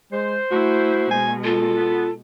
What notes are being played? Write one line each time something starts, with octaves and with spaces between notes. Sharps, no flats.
G#3 C5
A3 E4 F#4
B2 G#3 G#5
F4 A4
B3